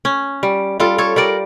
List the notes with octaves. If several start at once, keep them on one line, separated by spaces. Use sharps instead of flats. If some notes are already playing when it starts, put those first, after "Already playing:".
C#4
G3
G3 F4 A4
A4 C#5
G3 A#4 D5